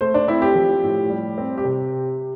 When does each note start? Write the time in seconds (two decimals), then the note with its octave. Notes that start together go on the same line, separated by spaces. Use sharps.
0.01 A3 C5
0.14 D4
0.28 C4 E4
0.42 G4
0.55 F3
0.83 A2
1.10 G3
1.38 C4
1.58 G4
1.65 C3